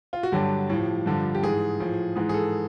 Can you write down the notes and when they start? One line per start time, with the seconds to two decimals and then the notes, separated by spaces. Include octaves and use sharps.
0.13 F4
0.23 F#4
0.32 G2 D3 F#3 G4
0.70 A2 F3
1.06 G2 D3 F3
1.35 G4
1.43 G#2 E3 G#4
1.80 A2 F3
2.16 G#2 E3 G#4
2.29 G#4
2.34 A4